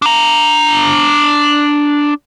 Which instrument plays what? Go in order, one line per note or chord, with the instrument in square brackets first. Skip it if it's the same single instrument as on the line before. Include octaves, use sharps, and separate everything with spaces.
[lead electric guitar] D4 A#5